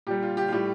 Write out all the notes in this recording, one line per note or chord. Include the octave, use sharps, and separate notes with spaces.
A#2 G3 G4
F4
G4
F4
A2 G3 G4